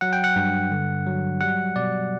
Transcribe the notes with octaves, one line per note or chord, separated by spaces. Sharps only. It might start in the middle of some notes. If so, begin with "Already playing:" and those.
F#3 F#5
G5
F#5
G2
D3
F#3
G3 F#5
B2 D5